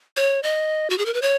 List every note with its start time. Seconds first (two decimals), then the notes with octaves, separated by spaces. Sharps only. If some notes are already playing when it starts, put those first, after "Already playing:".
0.17 C#5
0.43 D#5
0.90 F#4
0.98 G#4
1.06 A#4
1.14 B4
1.22 C#5